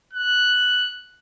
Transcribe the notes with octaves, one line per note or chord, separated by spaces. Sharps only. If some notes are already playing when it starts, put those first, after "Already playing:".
F#6